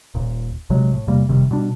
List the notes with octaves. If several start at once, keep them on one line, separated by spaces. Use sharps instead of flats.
D#1 A#2
A#1 C3 F#3 G#3
A2
E2 C3 G3 A#3
F1 C3 D#3 G3
B2 G3 D4